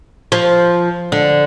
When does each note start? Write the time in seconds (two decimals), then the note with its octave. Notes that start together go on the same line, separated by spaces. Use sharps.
0.32 F3
1.12 D3